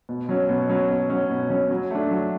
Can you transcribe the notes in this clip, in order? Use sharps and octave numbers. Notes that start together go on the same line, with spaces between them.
B2
F#3 C#4
B2
F#3 C#4
B2
F#3 C#4
B2
F#3 C#4
F#3
A3 D4
F#3